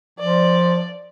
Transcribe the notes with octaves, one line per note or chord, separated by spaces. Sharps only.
F3 D5